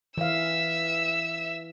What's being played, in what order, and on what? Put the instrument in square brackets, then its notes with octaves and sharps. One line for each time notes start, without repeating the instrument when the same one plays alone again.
[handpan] E3 F5 [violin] E5 E6